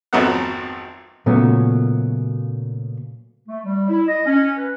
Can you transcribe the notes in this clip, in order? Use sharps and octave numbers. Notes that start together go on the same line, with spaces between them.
G#1 F2 F#3 A3 B3 F#5
A#2 C#3 F#3 A3 B3 C#4
A3
G3
E4
D#5
C#4
B4